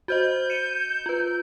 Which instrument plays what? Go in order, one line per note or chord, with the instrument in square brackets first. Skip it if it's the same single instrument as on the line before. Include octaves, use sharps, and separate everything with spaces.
[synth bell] F#4 C5 D#5 [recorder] G6
[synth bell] C#7 D#7 E7
F4 B4